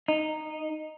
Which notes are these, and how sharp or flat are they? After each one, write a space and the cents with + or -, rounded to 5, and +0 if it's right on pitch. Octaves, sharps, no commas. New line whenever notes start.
D#4 -10